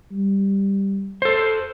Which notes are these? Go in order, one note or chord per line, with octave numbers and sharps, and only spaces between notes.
G3
A4 C5